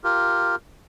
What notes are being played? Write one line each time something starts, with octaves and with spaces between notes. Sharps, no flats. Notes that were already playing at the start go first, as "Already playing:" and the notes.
F4 G4 A#4